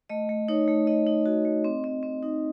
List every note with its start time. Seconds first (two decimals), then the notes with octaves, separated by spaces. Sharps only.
0.09 A3 D#5
0.29 A3
0.48 D#4 C#5
0.68 A3
0.87 D#4 D#5
1.07 D#4
1.26 F#4
1.45 A3
1.64 C4
1.84 C4
2.03 C4
2.23 D#4